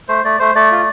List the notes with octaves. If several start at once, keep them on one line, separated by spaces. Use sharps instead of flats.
A3 C5
A3 D5
A3 C5
A3 D5
F4